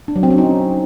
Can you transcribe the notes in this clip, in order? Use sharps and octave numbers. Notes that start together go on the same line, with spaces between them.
D4
F#3
C4
C#4
D#4